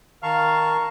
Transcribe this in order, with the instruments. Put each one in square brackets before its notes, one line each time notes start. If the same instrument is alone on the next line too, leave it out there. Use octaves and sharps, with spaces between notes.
[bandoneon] D#3 A5 C#6 [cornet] F5 [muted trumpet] A#5